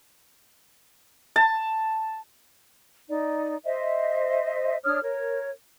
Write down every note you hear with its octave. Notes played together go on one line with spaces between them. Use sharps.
A5
D#4 D5
C5 D#5 E5
D4 C#5 D#6 F6
A#4 C#5